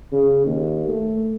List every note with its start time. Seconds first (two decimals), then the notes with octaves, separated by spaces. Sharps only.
0.12 C#3
0.46 D#2
0.88 A3